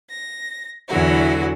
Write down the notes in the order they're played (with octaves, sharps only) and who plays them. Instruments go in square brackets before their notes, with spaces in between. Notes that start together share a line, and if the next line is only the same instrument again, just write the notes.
[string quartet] A#6
E2 D3 E3 F#3 F#4